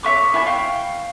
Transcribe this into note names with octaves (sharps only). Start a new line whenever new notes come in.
C#5 E5 C#6 D6
E4 E5 G#5 C#6
F5 G5 C#6